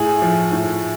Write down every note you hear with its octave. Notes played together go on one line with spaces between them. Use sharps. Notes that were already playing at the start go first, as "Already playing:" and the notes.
Already playing: A2 G#4
F3
A2